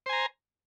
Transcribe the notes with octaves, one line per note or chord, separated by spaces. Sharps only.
C5 G#5 A#5